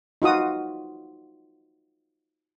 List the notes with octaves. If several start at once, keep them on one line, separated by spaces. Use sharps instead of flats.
D#4 F4 F#4 D#6